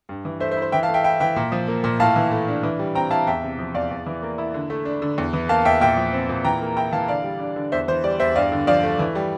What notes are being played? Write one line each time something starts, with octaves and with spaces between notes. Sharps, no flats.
G2
E3
A3 C5 E5
C5 E5
E4
C5
E3 E5 G5
F5 A5
A3
E5 G5
E4 E5 G5
E3 E5 G5
A#2
F3
A#3
A#2
A2 F5 A5
E3
A3
D4
E3
G3
C4 G5 A#5
E4 F5 A5
E2 E5 G5
C3
F3
E2 D5 F5
E2
E3
A#3
E4
D3
A3
D4
D3
E2
E3
A#3 F5 A5
E2 E5 G5
A#2 E5 G5
F3
C4
A#2
E3 G5 A#5
A#3
E4 G5 A#5
E3 F5 A5
D3 D5 F5
G3
D4
D3
E2 C5 E5
E3 C5
G3 D5
E2 C5 E5
G2 D5 F5
D3
F3 D5 F5
A3
E3
G3